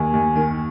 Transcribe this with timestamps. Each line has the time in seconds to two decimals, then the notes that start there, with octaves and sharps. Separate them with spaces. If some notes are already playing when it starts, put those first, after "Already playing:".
Already playing: D#2 A#3 G#5
0.13 D#2
0.36 D#3